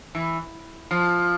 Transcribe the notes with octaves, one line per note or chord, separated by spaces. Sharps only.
E3
F3